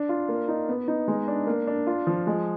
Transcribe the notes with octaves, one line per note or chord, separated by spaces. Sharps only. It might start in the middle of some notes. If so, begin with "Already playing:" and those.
Already playing: D4
F4
A#3
D#4
B3
D#4
G#3
D4
A#3
D4
F4
F3
G#3